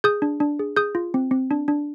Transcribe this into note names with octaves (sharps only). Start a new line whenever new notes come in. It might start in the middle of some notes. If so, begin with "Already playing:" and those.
G#4 D#6 G6
D4
D4
G#4
G#4 D#6 G6
F4
C4
C4
D4
D4